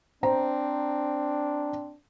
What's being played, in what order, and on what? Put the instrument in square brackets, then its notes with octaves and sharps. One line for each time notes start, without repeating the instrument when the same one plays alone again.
[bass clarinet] C4 [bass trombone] D4 [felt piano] C5 A#5